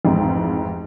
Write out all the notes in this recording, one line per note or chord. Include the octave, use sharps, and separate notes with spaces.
A1 F2 G#2